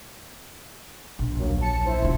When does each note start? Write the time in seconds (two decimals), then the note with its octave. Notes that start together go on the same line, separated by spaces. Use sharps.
1.19 A#1
1.39 D2 F#3 A#3
1.61 A5 C#7
1.85 E4 C5
2.02 E1 F4